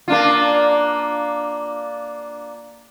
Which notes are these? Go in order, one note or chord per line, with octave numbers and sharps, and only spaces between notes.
A#3 D4 F4